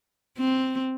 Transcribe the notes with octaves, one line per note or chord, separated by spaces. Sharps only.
C4